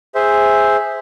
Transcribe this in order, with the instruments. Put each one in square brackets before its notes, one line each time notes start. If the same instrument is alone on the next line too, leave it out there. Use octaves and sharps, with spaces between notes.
[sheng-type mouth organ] G#4 C5 E5